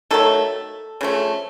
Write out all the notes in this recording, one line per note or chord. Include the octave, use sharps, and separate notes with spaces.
D#3 F#3 A3 A4
C#3 F3 A3